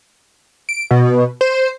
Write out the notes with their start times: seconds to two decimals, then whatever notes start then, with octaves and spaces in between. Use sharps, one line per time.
0.69 D7
0.91 B2
1.41 C5